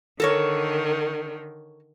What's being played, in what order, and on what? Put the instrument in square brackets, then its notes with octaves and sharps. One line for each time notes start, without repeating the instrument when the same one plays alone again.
[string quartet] D3 D#3 [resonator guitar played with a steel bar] A4 A#4 C#5